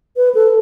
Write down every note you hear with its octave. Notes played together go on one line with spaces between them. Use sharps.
B4
A4